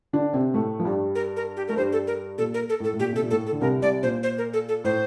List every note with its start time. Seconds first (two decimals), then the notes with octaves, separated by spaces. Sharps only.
0.13 D3 D4
0.33 C3 C4
0.54 A2 A3
0.80 F3
0.85 G2 G3
1.15 A#4
1.36 A#4
1.57 G4
1.68 A3 A#4
1.77 G2 G3 C5
1.92 A4
2.07 A#4
2.38 A#2 A4
2.54 A#4
2.69 A4
2.80 A2 A4
2.93 A2
2.99 A#2 G4
3.13 C3 A4
3.22 A#2
3.30 A2 A4
3.46 A4
3.52 D3
3.61 C2 C3 A#4
3.82 C2 C3 D5
4.03 A#2 C5
4.23 C5
4.38 A#4
4.53 A4
4.69 A4
4.84 A2 C5